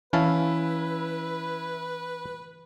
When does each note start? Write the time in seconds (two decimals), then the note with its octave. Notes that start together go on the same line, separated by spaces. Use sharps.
0.13 E3 C#4 E4 B4 F5 A5